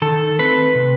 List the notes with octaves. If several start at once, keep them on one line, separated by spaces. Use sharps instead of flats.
D#3 A4
A3 C4 B4
C3